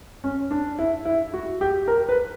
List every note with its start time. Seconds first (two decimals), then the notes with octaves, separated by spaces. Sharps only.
0.24 C#4
0.51 D4
0.79 E4
1.05 E4
1.34 F#4
1.61 G4
1.88 A#4
2.09 B4